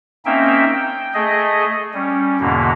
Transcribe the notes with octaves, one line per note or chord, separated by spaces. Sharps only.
A#3 C4 C#4 D#4 E5 G5
G5
A3 G#4 D#5
G3 C#4
E2 G#2 B2 D3 A#3